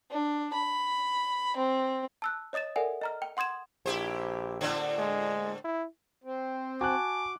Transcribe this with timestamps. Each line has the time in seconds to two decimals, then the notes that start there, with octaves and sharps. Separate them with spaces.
0.11 D4
0.54 B5
1.57 C4
2.22 A5 E6 F#6
2.53 C#5 D#5 D#6 A6 E7
2.76 A4 A#4 D5 E5 F#5 G#5
3.01 D#5 A#5 F6
3.22 G5
3.37 F#5 C6 D#6 G#6 E7
3.86 A#1 E4 G4 C5
4.61 A2 D3 C4
4.99 G#3
5.65 E4
6.24 C4
6.81 F#4 G#5 A5 D6 F#6